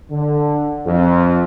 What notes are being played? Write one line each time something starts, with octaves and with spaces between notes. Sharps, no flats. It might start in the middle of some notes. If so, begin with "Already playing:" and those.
D3
F2